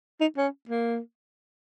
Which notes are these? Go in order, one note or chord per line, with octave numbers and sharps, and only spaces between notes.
D#4
C#4
A#3